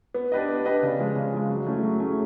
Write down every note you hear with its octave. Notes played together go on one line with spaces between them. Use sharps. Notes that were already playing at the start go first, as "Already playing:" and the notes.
B3
D4 G4 B4 D#5
B3
D4 G4 B4 D#5
C#3
F3 G#3
C#3
F3 G#3
F#3
A3 C#4 E4 G#4
F#3
A3 C#4 E4 G#4